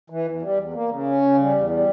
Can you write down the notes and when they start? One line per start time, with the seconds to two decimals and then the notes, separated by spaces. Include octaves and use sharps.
0.10 E3
0.26 E2
0.42 G3
0.58 E2
0.74 A#3
0.89 C#3
1.06 C#4
1.22 C#3
1.38 G3
1.53 E2
1.70 G3